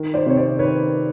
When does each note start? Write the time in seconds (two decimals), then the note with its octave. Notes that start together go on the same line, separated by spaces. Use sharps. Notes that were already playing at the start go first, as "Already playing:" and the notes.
Already playing: D#3
0.14 C5 D5
0.26 C3 C#5
0.37 C5 D5
0.59 D#3 B4 C#5